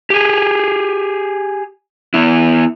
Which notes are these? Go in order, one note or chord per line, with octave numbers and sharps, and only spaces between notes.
G4 G#4
B3 E4